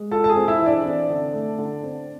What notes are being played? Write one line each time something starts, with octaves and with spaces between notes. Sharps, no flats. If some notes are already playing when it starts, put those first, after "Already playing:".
Already playing: G#3
F4 A4 A5
A5
G#4 G#5
C4
E4 E5
E3
D4 D5
C4
D3
A3
D3
C4